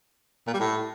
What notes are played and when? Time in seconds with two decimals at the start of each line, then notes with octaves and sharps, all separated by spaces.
0.47 A#2
0.53 G3
0.60 A2